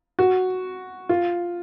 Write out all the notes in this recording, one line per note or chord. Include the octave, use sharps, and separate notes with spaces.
F#4
F4